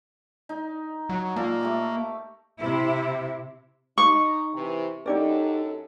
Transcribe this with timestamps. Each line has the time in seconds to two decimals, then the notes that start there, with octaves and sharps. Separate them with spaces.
0.49 D#4
1.09 F#3 F#4
1.36 A#2 A#3 A4
1.61 A3 G4 D6
2.59 C3 E4
3.98 D#4 C#6
4.53 C3 E3
5.06 F#2 D#4 G4 A4 D5